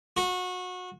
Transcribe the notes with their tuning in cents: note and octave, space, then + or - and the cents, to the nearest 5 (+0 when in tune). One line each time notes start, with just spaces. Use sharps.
F#4 -25